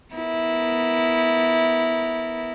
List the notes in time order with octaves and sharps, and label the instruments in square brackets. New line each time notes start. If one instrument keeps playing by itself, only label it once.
[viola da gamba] B3 E4 A#4